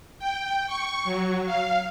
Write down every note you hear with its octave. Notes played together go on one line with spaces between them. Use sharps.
G5
C#6
F#3
F5